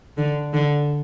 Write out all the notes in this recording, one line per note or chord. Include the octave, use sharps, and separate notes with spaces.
D3
D3